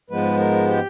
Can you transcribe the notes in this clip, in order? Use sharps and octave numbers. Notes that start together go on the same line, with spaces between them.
G#2 F3 G#3 B3 B4
A#4
G4